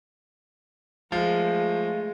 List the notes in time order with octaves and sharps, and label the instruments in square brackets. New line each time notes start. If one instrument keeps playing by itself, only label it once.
[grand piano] F3 [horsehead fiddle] G#3 [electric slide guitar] A3 F5